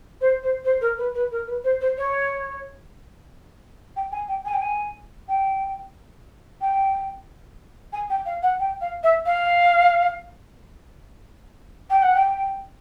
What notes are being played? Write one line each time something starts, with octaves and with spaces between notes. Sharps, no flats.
C5
C5
C5
A#4
B4
B4
A#4
B4
C5
C5
C#5
G5
G#5
G5
G#5
G5
G#5
G5
G5
G#5
G5
F5
F#5
G5
F5
E5
F5
G5
F#5
G5